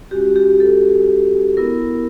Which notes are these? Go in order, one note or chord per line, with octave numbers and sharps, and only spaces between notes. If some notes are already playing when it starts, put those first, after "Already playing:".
G#3 C#4 F#4 G4
G4
A4
B3 E4 A#4